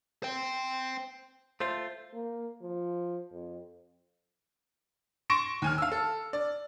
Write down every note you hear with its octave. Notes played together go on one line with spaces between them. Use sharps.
C5 G5
A3 F4 C5
A#3
F3
F2
C6 C#6 A#6 D7 E7
D#2 G#5 F6
F5 E6
A4
D5